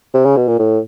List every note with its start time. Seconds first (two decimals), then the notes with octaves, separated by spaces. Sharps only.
0.14 C3
0.25 C#3
0.37 B2
0.48 A#2
0.59 A2